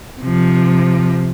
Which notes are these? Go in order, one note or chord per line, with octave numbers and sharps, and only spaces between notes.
C3 F3